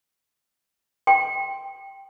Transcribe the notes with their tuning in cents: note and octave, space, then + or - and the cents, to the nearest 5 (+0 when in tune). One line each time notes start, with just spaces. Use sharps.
G5 +0 C6 +5